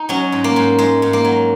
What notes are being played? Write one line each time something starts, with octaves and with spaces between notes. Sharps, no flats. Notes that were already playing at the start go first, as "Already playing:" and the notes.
Already playing: D#4
F#3 C#4
G#2
A#3
G#2
G#2 G#3
G#2
A#3
F#3